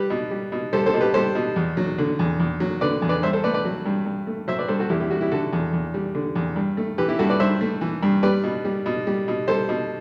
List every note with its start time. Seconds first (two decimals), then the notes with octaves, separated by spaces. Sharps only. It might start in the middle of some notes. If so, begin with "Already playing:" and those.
Already playing: G3 G4 B4
0.10 B2
0.31 G3
0.52 B2
0.73 G3 A4 C5
0.86 A4 C5
0.94 B2
1.01 G4 B4
1.14 G3 A4 C5
1.35 B2
1.56 E2
1.77 F#3
1.98 D3
2.19 E2
2.40 E2
2.60 F#3
2.81 D3 B4 D5
3.02 E2
3.09 B4 D5
3.23 G2 C5 E5
3.33 A4 C5
3.44 A3 B4 D5
3.54 B4 D5
3.65 F#3
3.86 G2
4.06 G2
4.27 A3
4.48 F#3 C5 E5
4.59 B4 D5
4.68 G2 A4 C5
4.79 F#4 A4
4.89 E2 E4 G4
5.00 E4 G4
5.10 G3 F#4
5.21 E4 G4
5.31 D3 F#4 A4
5.53 E2
5.73 E2
5.94 G3
6.15 D3
6.36 E2
6.56 G2
6.77 A3
6.98 E3 G4 B4
7.09 E4 G4
7.19 G2 F#4 A4
7.30 B4 D5
7.40 G2 C5 E5
7.61 A3
7.81 E3
8.03 G2
8.23 G3 B4 D5
8.44 B2
8.65 G3
8.86 B2
9.07 G3
9.28 B2
9.48 G3 A4 C5
9.69 B2